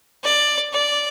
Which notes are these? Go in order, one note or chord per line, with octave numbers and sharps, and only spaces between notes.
D5
D5